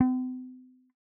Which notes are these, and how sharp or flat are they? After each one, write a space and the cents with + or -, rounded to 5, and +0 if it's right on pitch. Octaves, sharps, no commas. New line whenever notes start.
C4 -45